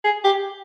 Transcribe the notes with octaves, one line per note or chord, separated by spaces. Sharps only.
G#4
G4